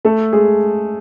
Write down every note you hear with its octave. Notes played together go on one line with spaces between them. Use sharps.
A3 A4
G#3 G#4